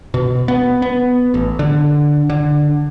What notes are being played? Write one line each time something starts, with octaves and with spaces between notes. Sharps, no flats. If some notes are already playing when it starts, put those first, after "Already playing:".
B2
B3
B3
A1
D3
D3